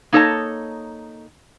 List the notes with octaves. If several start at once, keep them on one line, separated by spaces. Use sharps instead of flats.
A#3 D#4 A4 C#5 D#5 A5